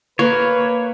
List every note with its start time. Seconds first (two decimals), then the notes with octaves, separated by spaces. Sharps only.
0.19 A#3 B4 C#5